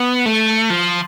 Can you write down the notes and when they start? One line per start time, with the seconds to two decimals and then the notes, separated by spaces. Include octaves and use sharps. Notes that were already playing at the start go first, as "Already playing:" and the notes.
Already playing: B3
0.26 A3
0.70 F3